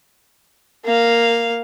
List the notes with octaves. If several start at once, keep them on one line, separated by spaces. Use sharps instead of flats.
A#3 F5